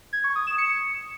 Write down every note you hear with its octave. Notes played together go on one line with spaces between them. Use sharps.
G#6
C#6
D#6
E7
C#7